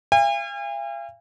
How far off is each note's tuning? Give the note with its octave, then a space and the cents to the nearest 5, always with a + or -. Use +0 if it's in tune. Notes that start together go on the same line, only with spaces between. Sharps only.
F5 -40 G#5 -45